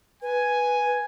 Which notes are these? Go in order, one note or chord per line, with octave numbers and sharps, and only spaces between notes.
B4 G#5